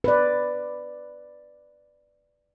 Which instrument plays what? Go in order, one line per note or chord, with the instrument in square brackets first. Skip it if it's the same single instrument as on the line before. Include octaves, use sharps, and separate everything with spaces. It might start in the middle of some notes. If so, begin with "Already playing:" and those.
[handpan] B4 D5